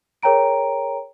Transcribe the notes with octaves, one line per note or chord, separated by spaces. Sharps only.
G#4 A#4 C#5 G5 A#5 D7